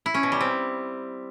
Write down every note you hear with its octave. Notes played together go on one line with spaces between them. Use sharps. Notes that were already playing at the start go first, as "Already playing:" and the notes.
E4
C#4
B2
G3
C4